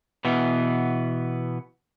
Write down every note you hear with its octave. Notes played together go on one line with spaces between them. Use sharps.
B2 E3 B3